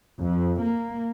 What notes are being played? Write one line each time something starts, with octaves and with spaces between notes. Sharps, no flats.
F2
A#3